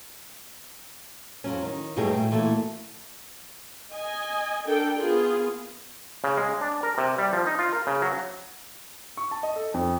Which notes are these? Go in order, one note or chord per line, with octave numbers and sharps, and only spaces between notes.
F2 F#3 C#4
D#3
G2 B2 F#3 A3 G4 G#4
A2 G5
A#2 E3 A3 A#3 F#4 A4
D#5 G#5
D4 A4 A#4 G5
B3 F4 G#4
C#3
G#3
D4
A#4
C3
G3
F3
D#4
F4
A#4
C#3
F#3
C#6
A5
D#5
A4
F2